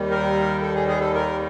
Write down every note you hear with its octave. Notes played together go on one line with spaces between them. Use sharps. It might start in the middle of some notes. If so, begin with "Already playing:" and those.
Already playing: D#2 D#3 G3
A#4
A4
G#4
G#4
A4
A#4